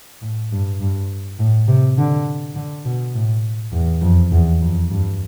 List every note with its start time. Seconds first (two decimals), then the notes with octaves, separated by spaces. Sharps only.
0.22 A2
0.51 G2
0.80 G2
1.39 A2
1.68 C3
1.98 D3
2.55 D3
2.85 B2
3.14 A2
3.73 E2
4.01 F2
4.31 E2
4.61 F2
4.90 G2